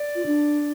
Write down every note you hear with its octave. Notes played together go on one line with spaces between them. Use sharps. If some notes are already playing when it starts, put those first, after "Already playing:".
Already playing: D5
F4
D4